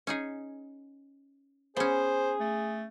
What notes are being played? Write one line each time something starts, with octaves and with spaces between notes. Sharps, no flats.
C#4 D#4 G#4
B3 C#4 G#4 C5
A3